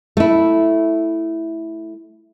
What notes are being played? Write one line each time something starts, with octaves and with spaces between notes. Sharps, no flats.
A3 E4